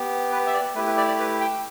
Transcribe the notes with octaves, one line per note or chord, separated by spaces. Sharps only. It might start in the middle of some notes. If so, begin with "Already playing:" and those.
Already playing: B3 G4
B4
E5
D5
A3 E4 G4 B4
B4
D5
D5
B4
G5